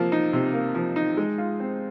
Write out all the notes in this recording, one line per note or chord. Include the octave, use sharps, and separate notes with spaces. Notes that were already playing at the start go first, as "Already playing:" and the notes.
Already playing: C3 F3 A#3
D#4
C3
A#3
F3
D#4
G#3
F4
C4